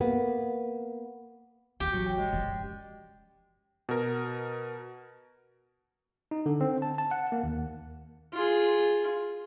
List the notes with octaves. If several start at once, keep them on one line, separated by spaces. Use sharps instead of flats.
A#3 B3
D#2 G4
A1 F#3 F#4
G5
G#3
F#2 F3 D5
B2 A#4
D#4
D3
C4
A5
A5
F#5
A#3
D#2
F4 G#4